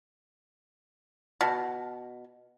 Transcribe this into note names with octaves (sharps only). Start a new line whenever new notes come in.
B2 A5 F6